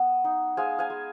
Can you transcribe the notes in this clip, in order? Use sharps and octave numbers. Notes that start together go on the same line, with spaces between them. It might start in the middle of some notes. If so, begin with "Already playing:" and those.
Already playing: B3
D#4
G#3 F5 G#5
F5 G#5
G#3